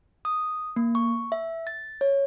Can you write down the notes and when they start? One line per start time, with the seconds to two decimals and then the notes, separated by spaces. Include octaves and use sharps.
0.25 D#6
0.76 A#3
0.95 C#6
1.32 E5
1.67 A6
2.01 C#5